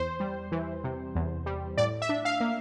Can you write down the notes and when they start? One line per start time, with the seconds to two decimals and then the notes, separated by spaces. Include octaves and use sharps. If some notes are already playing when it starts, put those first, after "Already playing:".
Already playing: E2 C5
0.20 G3
0.52 E3
0.84 C3
1.15 E2
1.46 G3
1.77 A2 D5
2.02 E5
2.09 D4
2.25 F5
2.40 A#3